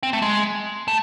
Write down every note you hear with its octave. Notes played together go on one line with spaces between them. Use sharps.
C4
A3
G#3
A3